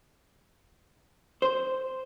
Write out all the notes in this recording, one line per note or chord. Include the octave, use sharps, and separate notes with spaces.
C5